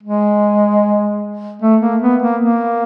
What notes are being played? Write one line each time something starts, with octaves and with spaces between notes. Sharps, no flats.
G#3
A3
A#3
B3
A#3
A#3